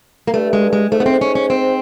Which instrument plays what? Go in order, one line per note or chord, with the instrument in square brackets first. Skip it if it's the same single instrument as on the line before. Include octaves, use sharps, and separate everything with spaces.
[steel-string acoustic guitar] A#3
[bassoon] G2 [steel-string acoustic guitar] A3
[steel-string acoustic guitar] G#3
G#3
[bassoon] G#2 [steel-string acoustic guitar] A3
[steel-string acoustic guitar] B3
C4
C#4
C#4
C4